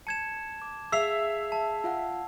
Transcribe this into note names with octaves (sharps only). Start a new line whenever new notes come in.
A5 G#6 C#7 E7
D6
G#4 E5 F5 E6 C7 F7
A5
F4 F5 F#5